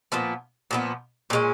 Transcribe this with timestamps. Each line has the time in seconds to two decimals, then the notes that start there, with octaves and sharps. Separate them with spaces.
0.12 A#2 F3 B3
0.71 A#2 F3 B3
1.30 A#2 G#3 C#4